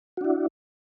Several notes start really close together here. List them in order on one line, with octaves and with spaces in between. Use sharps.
F#4 D4 E4